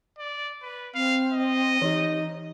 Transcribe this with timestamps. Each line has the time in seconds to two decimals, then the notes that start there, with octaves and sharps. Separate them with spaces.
0.19 D5
0.62 B4
0.95 C4 F5
1.32 D#5
1.82 E3 D#4 G4